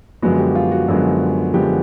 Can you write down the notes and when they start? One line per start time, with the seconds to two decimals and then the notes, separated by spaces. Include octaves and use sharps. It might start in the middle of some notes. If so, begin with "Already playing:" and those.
0.22 F#2 D3 F3 G#3 B3 F#4
0.39 G4
0.55 F4
0.72 F#4
0.88 F#2 D3 F3 G#3 B3
1.54 F#2 D3 F3 G#3 B3 G4